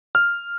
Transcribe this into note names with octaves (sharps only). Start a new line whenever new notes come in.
F6